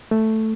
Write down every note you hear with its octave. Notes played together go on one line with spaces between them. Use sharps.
A3